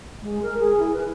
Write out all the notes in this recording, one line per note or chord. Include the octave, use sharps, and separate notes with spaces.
G#3
A#4
G#4
E4
B4